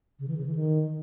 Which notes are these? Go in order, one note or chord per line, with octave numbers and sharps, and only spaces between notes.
C#3
E3
C#3
E3
D#3